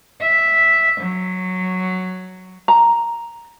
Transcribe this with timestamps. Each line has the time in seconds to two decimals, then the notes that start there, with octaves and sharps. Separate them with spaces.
0.21 E5
1.01 F#3
2.68 A#5